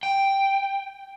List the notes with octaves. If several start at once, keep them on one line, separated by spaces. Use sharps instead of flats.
G5